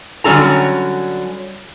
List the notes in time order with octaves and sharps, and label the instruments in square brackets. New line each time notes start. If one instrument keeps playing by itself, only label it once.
[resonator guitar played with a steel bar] D3 F#3 G3 C#4 A4 A#5